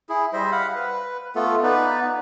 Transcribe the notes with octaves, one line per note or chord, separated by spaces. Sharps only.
E4 G#4
G3 C5 D#5 E5
F5 F#5 B5
B4
A3 B3 F4 A4
B3 D#4 B4 D5